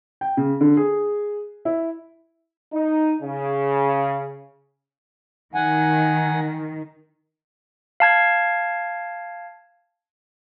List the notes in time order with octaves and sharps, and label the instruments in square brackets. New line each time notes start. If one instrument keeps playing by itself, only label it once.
[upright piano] G5
C#3
D3
G#4
E4
[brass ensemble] D#4
C#3
[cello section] D#3 [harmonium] F#5 G#5
[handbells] F5 A5 G#6